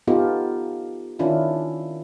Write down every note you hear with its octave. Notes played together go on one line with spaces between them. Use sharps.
B3 D#4 F4 G4 A4
D#3 C#4 D4 E4 F4